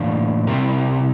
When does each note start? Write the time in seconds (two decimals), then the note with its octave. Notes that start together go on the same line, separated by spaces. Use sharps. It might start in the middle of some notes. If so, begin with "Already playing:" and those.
Already playing: A2 E3 A#3 D4 D5 F5
0.47 C3 G3 C4 E4 G4 A#4